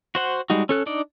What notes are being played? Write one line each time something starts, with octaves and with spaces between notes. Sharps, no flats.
F#4 C5 F#5
G3 G#3 D#4 F#4
C#4 A4 F#6
D4 D#4 D5